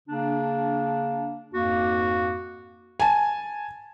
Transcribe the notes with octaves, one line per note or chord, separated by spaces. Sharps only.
C#3 A#3 D4
F2 G#2 A#3 F#4
G#5 A5